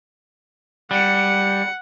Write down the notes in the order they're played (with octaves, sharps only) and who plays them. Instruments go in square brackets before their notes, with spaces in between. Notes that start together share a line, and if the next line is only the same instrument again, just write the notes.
[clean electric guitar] G3 [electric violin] F#5 C#7